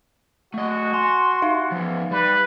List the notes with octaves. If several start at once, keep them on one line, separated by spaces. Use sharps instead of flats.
A3 F#4 D#5
G#5 C6
D#4 E5 F5
F3 B3
G3 B4